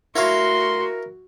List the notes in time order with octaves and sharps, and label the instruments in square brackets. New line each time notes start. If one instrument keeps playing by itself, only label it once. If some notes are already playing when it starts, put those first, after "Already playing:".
[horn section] A3 C6 [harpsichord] E4 C#5 F5 [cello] F#4 [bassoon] A#4